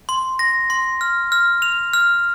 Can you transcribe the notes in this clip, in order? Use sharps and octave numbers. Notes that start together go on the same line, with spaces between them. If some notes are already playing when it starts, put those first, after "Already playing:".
C6
A#6
C6
F6
F6
F7
F6